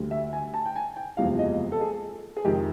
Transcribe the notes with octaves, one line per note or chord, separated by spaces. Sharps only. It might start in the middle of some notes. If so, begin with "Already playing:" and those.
Already playing: D2 D3 G3
E5
G#5
A5
G5
G#5
G5
F#1 E2 C3 F3 G#3 F5
D#5
A4
G#4
G#4
F2 C3 D#3 G#3 G4